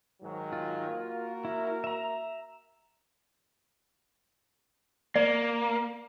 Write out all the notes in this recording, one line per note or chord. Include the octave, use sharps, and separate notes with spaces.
G#2 D#3 F#3
F4
A#3 F#4 A#4
E4
E5 A#5
A#3 D5